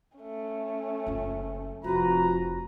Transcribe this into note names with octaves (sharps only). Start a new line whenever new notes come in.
A3 C#4
F#1 F4
F1 F3 F#4 B4 A#5